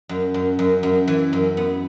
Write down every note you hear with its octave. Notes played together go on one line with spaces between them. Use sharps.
F#2
F#2
F#2
F#2
E3
F#2
B3